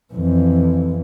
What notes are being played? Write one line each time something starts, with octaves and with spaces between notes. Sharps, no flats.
F2 E3